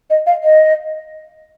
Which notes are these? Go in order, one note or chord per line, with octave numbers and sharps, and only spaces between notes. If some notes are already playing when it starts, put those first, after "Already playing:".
D#5
F5
D#5